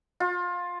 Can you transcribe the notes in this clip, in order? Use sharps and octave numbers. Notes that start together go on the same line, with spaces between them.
F4